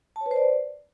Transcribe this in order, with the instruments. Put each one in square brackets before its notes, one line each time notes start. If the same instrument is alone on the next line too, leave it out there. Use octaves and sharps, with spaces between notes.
[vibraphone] A5
C#5
B4
C5
D5